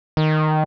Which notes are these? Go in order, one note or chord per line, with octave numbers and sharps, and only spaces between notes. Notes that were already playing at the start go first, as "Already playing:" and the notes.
D#3